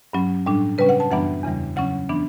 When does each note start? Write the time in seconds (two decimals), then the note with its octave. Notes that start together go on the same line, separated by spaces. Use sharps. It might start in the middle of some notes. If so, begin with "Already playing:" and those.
0.13 G2 F#3 C#4
0.46 A2 G3 D4
0.78 C#3 G3 C#4 B4
0.89 F#5
1.00 A5
1.11 F#2 E3 G3 B3 D4 F#5
1.43 E2 C#3 E3 G3
1.76 C#3 F#3 C#4 F#5
2.09 E3 B3 D4